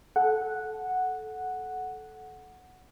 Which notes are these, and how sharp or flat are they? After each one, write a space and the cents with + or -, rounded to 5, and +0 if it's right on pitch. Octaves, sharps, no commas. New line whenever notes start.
A4 -20 F#5 +0